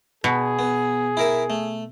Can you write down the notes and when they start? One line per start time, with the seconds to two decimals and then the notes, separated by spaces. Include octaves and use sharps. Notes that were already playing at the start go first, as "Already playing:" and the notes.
0.24 B2 G#4
0.59 B3
1.17 E4 A#4 E5
1.50 A3